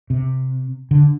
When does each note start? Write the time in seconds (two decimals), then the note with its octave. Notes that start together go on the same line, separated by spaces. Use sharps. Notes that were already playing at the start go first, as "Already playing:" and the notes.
0.10 C3
0.91 D3